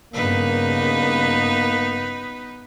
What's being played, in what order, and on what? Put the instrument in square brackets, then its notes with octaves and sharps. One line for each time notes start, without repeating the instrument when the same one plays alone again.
[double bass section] G2 C#3 [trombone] A#3 [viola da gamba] B3 D#4 B4